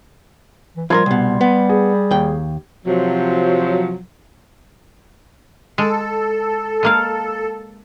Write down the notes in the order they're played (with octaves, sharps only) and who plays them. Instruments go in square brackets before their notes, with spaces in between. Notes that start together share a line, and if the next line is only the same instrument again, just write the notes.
[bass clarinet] E3
[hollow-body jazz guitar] F3 A4 A#4 [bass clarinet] G3 [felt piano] C6 G#6
[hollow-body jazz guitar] C2 B2
B3
[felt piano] G#4
[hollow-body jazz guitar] D#2 G5
[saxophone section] C3 F3 F#3
[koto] G#3 [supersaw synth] A4
[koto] G#3 A#3 F5